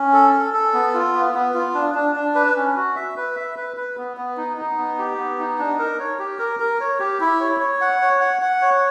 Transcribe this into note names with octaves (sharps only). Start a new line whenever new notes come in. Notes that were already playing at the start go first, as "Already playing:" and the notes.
Already playing: C#4
A4
A4
A4
B3
F4
B3
B3
F4
D4
D4
D4
B4
C#4
F#4
E5
B4
E5
B4
B4
B3
B3
D#4
D#4
B3
G4
B3
D#4
D4
A#4
C#5
G4
A#4
A#4
C#5
G4
E4
C#5
C#5
F#5
C#5
F#5
F#5
C#5